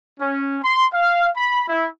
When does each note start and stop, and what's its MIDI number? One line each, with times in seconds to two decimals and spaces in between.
0.20 0.58 61
0.63 0.86 84
0.93 1.28 77
1.35 1.63 83
1.68 1.88 64